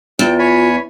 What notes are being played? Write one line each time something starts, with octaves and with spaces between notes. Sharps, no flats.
E2 F4 G5
C#5 G#5 B5